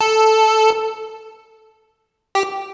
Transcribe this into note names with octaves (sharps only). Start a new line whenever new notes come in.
A4
G4